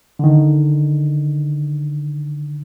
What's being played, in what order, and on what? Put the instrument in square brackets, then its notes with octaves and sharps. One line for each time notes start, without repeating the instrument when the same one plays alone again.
[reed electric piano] D3 D#3